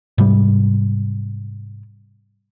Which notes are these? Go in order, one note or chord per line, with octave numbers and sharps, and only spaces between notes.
G#2 C3 G3